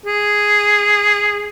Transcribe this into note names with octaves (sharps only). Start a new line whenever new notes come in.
G#4